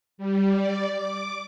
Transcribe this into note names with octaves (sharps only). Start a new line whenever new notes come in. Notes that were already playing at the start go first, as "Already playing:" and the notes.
G3
D5
D6